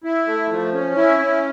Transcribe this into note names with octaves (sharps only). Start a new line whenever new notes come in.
E4
A3
F3
C#4
E4
C#4